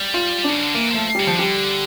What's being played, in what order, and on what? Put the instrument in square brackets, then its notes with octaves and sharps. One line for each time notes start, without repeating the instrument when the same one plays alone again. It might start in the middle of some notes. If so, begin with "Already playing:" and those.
Already playing: [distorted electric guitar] G3
[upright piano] F4
[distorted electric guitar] C#3 [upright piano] D4
[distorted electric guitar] D3
[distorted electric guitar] E3 [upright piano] A#3
[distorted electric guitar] F3 [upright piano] A3
[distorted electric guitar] C#3 [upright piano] G3
[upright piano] F3
[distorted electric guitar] D3 [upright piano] G3